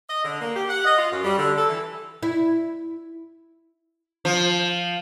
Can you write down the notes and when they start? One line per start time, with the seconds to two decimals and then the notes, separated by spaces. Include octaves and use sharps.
0.10 D#5
0.25 D3
0.41 A#3
0.56 G4
0.69 F#5
0.85 D#5
0.98 F4
1.11 F#2
1.24 G3
1.38 D3
1.57 A4
1.69 E3
2.23 E4
4.25 F3